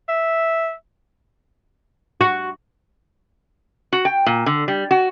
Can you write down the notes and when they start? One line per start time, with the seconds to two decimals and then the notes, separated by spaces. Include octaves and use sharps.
0.09 E5
2.21 F#4
3.93 F#4
4.05 G5
4.26 A#2
4.46 D3
4.68 G3
4.91 F#4